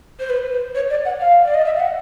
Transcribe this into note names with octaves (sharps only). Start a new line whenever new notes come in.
C5
B4
C5
C#5
D5
F#5
F5
D5
D#5
E5
F5
F#5